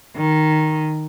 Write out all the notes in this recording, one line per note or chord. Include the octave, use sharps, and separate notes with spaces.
D#3